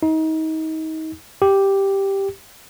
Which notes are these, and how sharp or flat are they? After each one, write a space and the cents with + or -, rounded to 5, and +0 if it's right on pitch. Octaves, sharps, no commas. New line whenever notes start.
D#4 +30
G4 +0